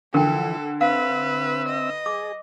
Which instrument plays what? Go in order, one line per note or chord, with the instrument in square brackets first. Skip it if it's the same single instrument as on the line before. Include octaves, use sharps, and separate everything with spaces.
[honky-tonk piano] D3 [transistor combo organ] E3 F3 [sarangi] A4 [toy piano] A#4 G5
[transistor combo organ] C4 E5 E6 [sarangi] B4 [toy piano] F5
[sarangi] D#5
[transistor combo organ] G#4 [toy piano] D6